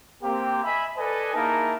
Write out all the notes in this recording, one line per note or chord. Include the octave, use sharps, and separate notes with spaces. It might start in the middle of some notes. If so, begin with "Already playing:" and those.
A#3 C4 G4
D#5 E5 G#5 B5
A4 B4 D5 D#5 G#5
A#3 D#4 E4 G#4 A#4 A5